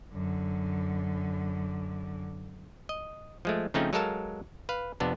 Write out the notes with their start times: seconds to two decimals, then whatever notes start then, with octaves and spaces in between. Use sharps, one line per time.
0.13 F#2 D3
2.89 D#5
3.45 F3 G#3 A3
3.74 C#3 F3 A3 C4 C#4 D#4
3.93 F#3 G#3 A4 A#4 F5 A5
4.69 B4 F5
5.00 F2 C3 B3 D4